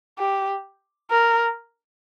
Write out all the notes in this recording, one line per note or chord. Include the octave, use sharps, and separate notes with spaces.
G4
A#4